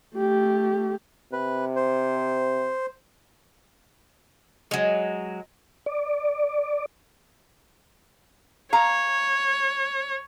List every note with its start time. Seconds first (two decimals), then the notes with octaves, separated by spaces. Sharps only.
0.16 A3 G4
1.33 C3 B4
1.76 C5
4.71 F#3 G#3
5.86 D5
8.73 C#5 F5 A#5